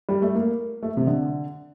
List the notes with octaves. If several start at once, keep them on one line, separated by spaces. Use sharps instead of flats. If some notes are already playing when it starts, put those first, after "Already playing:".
G3
A3
A#3
A3
C3
D3